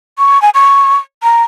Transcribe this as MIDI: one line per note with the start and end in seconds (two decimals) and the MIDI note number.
0.18 0.41 85
0.42 0.50 80
0.54 0.96 85
1.23 1.43 82